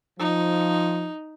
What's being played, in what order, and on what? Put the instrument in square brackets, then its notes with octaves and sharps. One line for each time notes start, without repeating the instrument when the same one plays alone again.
[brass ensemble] F3 [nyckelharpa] D#4